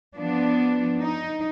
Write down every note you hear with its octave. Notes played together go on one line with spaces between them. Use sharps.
F3 B3 D4
D#4